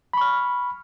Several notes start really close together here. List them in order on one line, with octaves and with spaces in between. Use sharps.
B5 C#6 F6